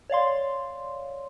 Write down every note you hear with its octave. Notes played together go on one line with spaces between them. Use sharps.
C#5 D5 F5 C6